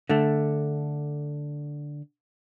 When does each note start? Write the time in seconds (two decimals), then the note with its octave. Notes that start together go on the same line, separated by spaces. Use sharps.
0.09 D3 A3